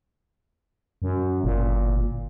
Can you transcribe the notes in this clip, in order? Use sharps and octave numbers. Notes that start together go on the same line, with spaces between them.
F#2
G1 A#2